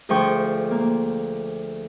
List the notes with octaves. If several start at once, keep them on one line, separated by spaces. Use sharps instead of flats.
D2 F3 G#4 G5 C#6
A#3